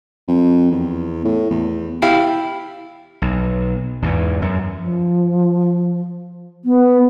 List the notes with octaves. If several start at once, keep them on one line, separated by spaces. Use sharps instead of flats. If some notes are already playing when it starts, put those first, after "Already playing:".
F2
E2
A2
E2
E4 G4 F5
B1
E2 G#2 E3
F#2
F3
B3